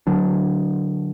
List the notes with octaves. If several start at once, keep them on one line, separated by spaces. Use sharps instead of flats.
D3 F#3 D4